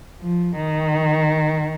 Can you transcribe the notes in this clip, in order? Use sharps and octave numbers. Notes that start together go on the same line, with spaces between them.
F3
D#3